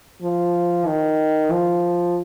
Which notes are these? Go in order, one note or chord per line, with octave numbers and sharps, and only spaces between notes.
F3
D#3
F3